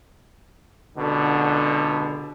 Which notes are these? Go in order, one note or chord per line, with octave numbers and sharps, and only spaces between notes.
C#2 B2 D3